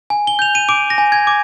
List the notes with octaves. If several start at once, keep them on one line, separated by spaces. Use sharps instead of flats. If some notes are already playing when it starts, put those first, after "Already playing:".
G#5
G7
G6 F7
D#7
D6 D7
A#6
G#5
G#6
D6